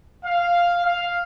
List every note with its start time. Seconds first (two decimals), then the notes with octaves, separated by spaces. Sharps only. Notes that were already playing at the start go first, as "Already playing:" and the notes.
0.24 F5
0.84 F5